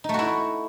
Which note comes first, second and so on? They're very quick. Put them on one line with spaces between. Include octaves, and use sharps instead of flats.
D#4 A3 F#4 E4